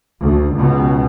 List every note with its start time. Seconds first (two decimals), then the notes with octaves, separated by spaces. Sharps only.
0.21 D2
0.53 C#2 B2